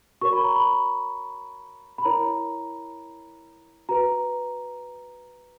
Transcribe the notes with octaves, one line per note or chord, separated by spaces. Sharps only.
F#4 A#4 C#5 C#6
B5
A#5
B5
B5
E4 A#4 C#5 A#5
F#4 B4 A#5